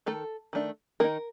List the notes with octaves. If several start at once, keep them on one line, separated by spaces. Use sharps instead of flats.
D#3 A3 A4
D#3 A3 D4
D#3 A#3 D#4 A#4